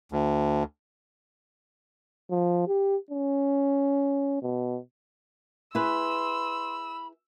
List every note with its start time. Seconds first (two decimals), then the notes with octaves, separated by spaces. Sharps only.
0.12 D2
2.31 F3
2.68 G4
3.11 C#4
4.42 B2
5.75 E4 G#4 B4 B5 C6 E6